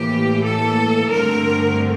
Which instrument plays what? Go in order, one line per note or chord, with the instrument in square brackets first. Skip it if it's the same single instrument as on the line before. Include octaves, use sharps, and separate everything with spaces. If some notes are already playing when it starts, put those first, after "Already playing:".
Already playing: [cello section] A2 E3 A#3 G4
A4
G2 D3 A3 C4 A#4